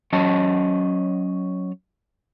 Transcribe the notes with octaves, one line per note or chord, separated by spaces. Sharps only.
F#3 C#4 C#5 D#5 A5